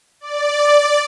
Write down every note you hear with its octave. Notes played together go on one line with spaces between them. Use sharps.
D5